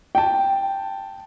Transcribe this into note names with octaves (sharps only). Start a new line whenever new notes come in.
G5 A5